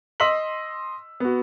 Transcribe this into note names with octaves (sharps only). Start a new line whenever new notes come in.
D#5 C6 E6 B6 F#7
B3 F#4